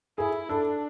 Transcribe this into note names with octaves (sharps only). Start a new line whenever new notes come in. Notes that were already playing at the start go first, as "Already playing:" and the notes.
E4 G#4
D4 A4